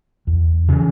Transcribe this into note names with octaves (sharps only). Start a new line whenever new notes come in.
E2
C#3 E3